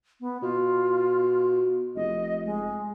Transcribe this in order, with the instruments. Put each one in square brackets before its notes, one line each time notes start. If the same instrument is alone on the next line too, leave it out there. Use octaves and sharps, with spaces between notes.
[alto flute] B3
[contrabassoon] B2 [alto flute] F4
[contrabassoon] F1 [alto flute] D#5
[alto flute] G#3